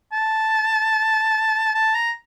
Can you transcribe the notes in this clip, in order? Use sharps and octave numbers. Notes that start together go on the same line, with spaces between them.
A5
A5
A#5